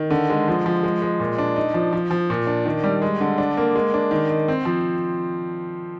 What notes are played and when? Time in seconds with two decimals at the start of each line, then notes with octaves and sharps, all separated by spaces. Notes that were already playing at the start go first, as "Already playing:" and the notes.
Already playing: D#3
0.10 D3
0.30 G#3
0.48 F3
0.66 F3
0.83 G#3
1.02 G#3
1.20 A#2
1.38 D4
1.56 D#4
1.74 F3
1.93 F3
2.11 F3
2.30 A#2
2.47 D4
2.66 D#3
2.84 G3
3.02 G#3
3.21 D3
3.38 D4
3.57 A#3
3.76 G#3
3.94 D4
4.11 D#3
4.30 D#3
4.48 C4
4.65 F3